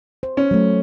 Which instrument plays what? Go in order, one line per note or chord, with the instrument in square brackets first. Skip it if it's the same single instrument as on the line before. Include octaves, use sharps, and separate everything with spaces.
[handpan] C5
[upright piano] C#4
[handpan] F#3 A3